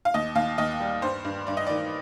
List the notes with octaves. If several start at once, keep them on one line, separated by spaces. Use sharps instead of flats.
F5
D#2 D#5
D#2 F5
D#2 D#5
G3
G2 C5
G2
G2 D5
D#5
D#3 D5